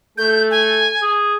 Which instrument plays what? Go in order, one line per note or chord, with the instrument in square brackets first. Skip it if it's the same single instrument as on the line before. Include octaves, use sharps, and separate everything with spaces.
[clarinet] A3 [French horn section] A4 [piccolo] G6
[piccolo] G#5
[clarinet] G#4